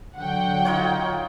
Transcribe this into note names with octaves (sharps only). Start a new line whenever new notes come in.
D3 F#3 F#5 G5
D#4 F4 C#5